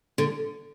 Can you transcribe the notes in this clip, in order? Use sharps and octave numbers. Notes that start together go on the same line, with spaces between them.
D3